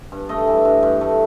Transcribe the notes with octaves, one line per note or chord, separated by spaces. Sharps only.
G2
A3 D#5
E3
G2
G2
A3